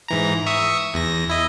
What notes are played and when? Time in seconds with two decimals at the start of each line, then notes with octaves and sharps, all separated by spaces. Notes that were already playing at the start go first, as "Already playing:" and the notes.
0.08 G#2 E3 A#5
0.46 E5 C#6 D#6
0.94 E2 A#6
1.29 E4 D#5